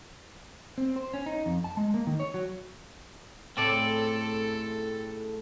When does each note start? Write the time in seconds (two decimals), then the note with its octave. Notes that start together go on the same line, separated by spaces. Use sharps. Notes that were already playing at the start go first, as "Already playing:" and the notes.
0.78 C4
0.96 C5
1.14 C#4
1.26 D#4
1.46 F2
1.64 A5
1.77 G#3
1.94 A#3
2.07 D#3
2.20 C#5
2.34 F#3
3.57 A2 C#3 A3 C4 A4 D5